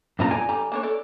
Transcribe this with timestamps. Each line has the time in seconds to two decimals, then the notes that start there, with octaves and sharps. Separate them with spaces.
0.19 F#2 A#2 D4 D#4 F4 A#5
0.31 D5 G#5
0.49 D3 G3 A#5
0.72 A#3 D4 C#5
0.83 A4 D5